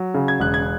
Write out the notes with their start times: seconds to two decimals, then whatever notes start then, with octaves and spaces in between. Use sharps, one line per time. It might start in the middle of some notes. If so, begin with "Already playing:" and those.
Already playing: F#3
0.14 C#3
0.28 G#6
0.40 E1 F#6
0.54 G#6